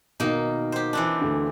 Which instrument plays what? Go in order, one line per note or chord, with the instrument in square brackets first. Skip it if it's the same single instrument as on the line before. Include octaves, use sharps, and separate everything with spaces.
[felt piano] B2 D#3 [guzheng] A#3 D#4
[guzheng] G4 C5
E3 C4 D4
[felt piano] D2 D3